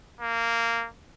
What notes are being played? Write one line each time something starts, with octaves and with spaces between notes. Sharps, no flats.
A#3